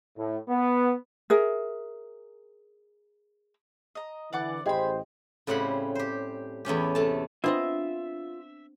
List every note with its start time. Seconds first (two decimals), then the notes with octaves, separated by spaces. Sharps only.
0.17 A2
0.48 B3
1.30 G#4 A#4 E5
3.95 D#5 A#5
4.33 D3 E3 D5 F#5 D6
4.66 A1 G4 G#4 C5 D#5 G5 B5
5.47 A2 C#3 G3 C4 F#5 B5
5.95 G4 C5
6.65 E2 A3 C#4 G4
6.95 C3 A3 A5
7.44 B3 C4 D4 F4 D#5 E5